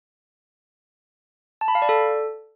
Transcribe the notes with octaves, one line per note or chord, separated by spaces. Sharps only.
A5
B5
F5
D5
A4